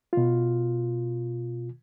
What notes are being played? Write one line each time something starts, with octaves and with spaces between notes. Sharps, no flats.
B2 F4